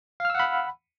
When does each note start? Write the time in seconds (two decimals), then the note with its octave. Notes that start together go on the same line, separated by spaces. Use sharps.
0.20 F5
0.25 F6
0.30 E6
0.35 F#5
0.40 B5